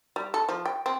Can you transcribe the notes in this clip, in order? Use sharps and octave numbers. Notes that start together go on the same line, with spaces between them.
G3
A4
F3
G5
C4